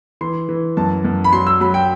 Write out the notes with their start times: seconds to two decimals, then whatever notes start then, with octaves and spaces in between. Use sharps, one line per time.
0.21 E3 C6
0.49 E3
0.77 F#2 A5
1.05 F#2
1.24 B5
1.33 F#3 C6
1.47 E6
1.60 F#3 B5
1.74 G5